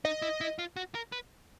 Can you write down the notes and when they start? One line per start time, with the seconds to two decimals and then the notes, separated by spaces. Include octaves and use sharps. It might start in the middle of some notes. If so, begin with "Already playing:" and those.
0.05 D#4 D#5
0.22 E4
0.41 E4
0.59 F4
0.76 F#4
0.95 A#4
1.12 B4